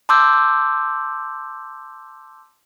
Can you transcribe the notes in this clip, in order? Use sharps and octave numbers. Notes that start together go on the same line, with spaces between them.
A5 C6 D6 E6 G6